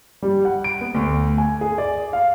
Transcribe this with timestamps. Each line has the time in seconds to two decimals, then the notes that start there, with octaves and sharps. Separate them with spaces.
0.22 G3
0.45 F#5
0.64 D7
0.81 B3
0.95 D2
1.38 G#5
1.61 G#4
1.78 D5
2.13 F5